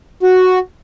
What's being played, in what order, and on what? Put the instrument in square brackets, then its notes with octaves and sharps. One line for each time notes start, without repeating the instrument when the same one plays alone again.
[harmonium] F#4